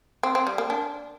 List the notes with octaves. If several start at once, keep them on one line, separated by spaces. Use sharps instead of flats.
C4
C4
G3
A#3
D4